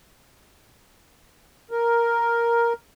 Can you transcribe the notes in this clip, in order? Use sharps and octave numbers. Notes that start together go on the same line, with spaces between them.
A#4